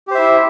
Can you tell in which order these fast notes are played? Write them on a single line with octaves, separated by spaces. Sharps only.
G4 C5 E5 E4